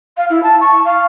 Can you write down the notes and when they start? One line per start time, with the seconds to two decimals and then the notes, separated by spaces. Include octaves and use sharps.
0.17 F5
0.30 E4
0.43 A5
0.60 C#6
0.85 F5